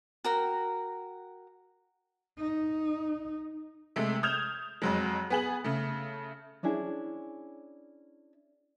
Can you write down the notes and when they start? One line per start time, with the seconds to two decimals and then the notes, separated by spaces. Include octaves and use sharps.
0.24 F#4 A#4 G5
2.38 D#4
3.96 C3 G#3 A3
4.23 D#6 F6 G6 G#6 E7 F7
4.82 F2 F#3 G#3
5.30 B3 G#4 F#7
5.64 C#3 A3
6.63 C#4 D4 E4 G#4